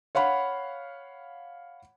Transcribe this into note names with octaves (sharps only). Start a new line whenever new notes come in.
C#5 F5 F#5 B5